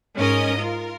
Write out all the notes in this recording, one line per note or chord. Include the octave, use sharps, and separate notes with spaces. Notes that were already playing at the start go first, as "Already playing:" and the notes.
G#2 C#4 A#4 D#5 D#6
F4 A#4